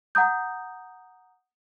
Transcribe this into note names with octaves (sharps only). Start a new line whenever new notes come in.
F#5 A#5 D#6 G6